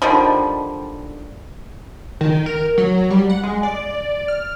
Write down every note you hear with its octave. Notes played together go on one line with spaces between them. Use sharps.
D3 D#3 F3 G3
D#3
A#4
F#3
G3
F#5
G#3
D5
F6